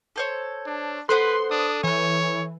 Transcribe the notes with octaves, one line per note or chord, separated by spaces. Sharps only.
A4 C5 C#5
D4
B3 A4 B4 C5 F#5 C6
D4 D#6
E3 C#5 G#5 G6